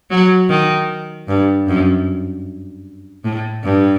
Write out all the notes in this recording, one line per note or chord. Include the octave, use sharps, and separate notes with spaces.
F#3
D#3
G2
F#2
A2
G2